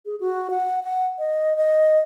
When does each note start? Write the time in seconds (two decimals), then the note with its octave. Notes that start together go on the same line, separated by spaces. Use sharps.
0.06 G#4
0.20 F#4
0.50 F#5
0.84 F#5
1.19 D#5
1.57 D#5